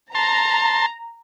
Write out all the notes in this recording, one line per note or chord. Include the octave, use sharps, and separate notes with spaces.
A5 A#5 C6